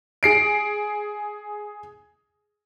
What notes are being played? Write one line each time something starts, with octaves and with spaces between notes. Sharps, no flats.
G#4 C7 D7